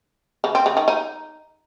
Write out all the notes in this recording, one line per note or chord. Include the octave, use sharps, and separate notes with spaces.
C#3
C4
C#3
D#3
D#4